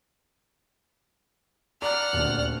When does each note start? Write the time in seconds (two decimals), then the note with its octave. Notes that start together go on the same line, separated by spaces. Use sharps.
1.82 D5 F#5 A#5 F6
2.13 D#1 D2